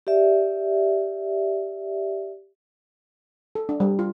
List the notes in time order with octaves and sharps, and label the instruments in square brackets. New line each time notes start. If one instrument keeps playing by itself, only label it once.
[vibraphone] G4 D5 E5
[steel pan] A4
D4
G3
F4